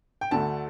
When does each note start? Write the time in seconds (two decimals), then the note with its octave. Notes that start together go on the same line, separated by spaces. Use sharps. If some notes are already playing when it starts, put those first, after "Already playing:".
0.21 G5
0.31 D2 D3 A3 A5